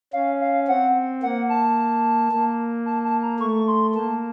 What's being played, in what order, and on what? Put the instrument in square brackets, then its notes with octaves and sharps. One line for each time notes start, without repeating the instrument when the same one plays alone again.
[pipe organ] C#4 [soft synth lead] F5
[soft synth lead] F5
[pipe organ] C4 [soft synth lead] F#5
[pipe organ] A#3 [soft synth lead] F#5
[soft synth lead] A5
[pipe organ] A#3
[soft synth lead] A5
A5
A#5
[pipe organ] A3 [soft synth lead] C#6
[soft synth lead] C6
[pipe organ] A#3 [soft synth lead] A5